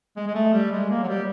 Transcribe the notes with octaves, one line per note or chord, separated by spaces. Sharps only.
G#3
G#3
A3
G3
G#3
A#3
F#3
G3